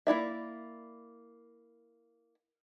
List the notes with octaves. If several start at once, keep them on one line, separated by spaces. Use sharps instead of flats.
A#3 E4 D5 E5